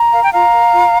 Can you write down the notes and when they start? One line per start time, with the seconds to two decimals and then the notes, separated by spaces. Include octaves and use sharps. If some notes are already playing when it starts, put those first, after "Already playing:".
Already playing: A#5
0.12 A#4 F5
0.22 G5
0.32 F4 F5 A#5
0.53 A#4
0.72 F4